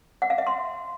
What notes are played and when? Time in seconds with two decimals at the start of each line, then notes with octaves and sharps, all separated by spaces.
0.22 F#5
0.30 F5
0.38 E5
0.47 C6